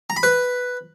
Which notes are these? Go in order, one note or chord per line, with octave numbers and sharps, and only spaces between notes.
A#5
B5
B4